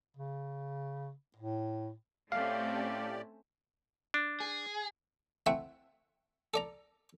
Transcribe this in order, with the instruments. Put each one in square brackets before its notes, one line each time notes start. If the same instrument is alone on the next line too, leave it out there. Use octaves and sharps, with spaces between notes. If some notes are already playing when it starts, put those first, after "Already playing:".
[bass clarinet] C#3
A2
[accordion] A2 G4 D5 [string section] A3 C4 C#4 [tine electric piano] F5
[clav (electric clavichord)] D4
[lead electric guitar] G#4
[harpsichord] A3 C4 E4 E5 F#5
A4 D5 A#5